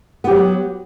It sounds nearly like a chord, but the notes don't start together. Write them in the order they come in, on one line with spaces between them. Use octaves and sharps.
B3 G4 F#3